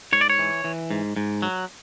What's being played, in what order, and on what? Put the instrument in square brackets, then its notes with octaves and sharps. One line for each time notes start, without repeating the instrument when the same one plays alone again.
[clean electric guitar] G#2 C#5
D5
C#5
E3
E3
G#2
G#2
F#3